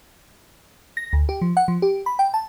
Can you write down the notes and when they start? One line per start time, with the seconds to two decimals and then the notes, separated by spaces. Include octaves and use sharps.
0.97 A#6
1.13 D2
1.29 G4
1.42 F3
1.57 F#5
1.68 F3
1.82 G4
2.06 B5
2.19 G5
2.34 A5